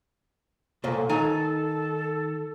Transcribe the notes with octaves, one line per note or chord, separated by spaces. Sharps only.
C2 A#2 A4 C5 C#5
D#3 D#4 A4 G#5 A#5